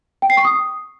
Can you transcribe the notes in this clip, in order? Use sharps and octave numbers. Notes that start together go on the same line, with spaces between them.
G5
C7
C#6
D#6